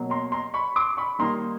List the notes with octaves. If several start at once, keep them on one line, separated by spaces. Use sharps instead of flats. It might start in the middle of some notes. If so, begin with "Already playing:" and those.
Already playing: B2 F#3 A#3
A#5 C6
A#5 C6
B5 C#6
C6 D6
B5 C#6
D#3 G3 A#3 D#4 A#5 C6